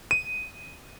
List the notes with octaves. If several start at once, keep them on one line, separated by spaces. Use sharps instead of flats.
D#7